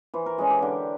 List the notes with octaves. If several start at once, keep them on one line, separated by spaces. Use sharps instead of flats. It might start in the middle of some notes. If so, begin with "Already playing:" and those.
E3 C5
A#4
G#3 C#4 G#4
G4
D3